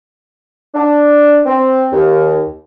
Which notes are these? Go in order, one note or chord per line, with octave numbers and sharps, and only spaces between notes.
D4
C4
D#2